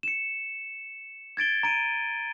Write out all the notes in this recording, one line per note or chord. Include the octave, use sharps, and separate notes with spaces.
C#7 E7
G#6 A6 D7 G7
A#5 D7 D#7